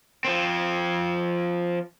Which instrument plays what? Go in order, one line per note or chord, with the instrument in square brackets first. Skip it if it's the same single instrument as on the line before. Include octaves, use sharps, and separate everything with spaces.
[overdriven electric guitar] F3 C4